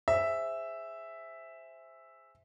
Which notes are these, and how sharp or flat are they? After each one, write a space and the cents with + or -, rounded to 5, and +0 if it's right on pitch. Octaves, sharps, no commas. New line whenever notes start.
G#4 -10 C5 +0 E5 +0